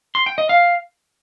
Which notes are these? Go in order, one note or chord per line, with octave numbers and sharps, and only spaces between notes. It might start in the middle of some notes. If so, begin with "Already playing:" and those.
C6
G5
D#5
F5